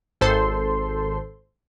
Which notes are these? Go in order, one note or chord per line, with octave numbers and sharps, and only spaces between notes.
G#1 A4 C5 C6